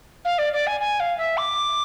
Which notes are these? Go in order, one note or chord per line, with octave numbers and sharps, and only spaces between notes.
F5
D5
D5
G#5
G#5
F5
E5
D6